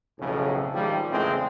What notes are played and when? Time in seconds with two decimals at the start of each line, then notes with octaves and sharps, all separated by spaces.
0.20 B1 F2 A2 C#3
0.74 D#3 F3 G3 G#3
1.10 E2 A2 C#3 G#3 C4